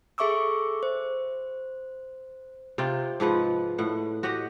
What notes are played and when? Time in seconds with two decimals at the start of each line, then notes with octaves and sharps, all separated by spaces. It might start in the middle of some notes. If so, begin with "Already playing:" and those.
0.18 G#4 A4 E5 C#6 D6 E6
0.83 C5
2.78 C3 F4 G5
3.20 G#2 F3 B4 F#5
3.78 A2 F#5
4.23 F#4 G4 D#5 F#5